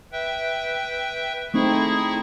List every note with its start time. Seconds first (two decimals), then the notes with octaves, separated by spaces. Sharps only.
0.12 B4 E5 G5
1.54 A3 C4 D#4 E4 G#4 C#6